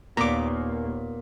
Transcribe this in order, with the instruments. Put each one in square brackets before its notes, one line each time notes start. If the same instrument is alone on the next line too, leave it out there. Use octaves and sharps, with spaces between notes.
[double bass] D#2 A#3 [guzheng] A#2 [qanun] B3 [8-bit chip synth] A#5 D6